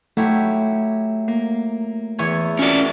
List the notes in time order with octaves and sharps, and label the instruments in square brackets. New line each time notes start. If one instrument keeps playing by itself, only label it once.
[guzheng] F#3 E4 G4 [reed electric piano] A3
[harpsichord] A#3
[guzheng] E2 E4 C#5 [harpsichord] G#5
[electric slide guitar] C#4 D5 [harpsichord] F4 F#4 A#4